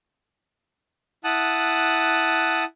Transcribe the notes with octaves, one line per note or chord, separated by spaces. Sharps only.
E4 F#5 A5 D#6 F#6